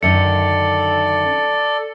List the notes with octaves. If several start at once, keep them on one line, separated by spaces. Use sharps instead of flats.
F#2 D3 D#3 A4 D5 C#7